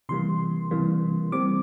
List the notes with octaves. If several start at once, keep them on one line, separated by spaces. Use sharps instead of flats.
C3 E3 G3 A#3 C6
C3 E3 G3 A#3
E3 G3 C4 D6